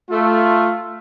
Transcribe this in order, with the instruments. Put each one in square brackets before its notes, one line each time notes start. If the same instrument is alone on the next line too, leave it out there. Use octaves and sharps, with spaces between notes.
[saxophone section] A3 [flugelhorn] F4